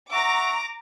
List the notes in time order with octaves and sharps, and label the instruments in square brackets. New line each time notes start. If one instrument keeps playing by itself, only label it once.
[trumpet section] E5 F#5 C#6 [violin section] A#5 D6